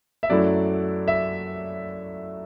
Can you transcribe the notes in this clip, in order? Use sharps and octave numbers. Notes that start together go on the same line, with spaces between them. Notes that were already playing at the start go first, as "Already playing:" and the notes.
E5
F#2 F#3 A3 E4 D5
E5